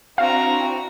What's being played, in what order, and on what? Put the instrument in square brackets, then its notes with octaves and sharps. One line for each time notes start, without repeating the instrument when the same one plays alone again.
[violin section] C4 D4 E4 [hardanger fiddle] F#4 A#5 [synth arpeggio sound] F5